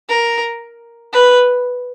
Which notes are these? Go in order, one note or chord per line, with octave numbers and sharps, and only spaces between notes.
A#4
B4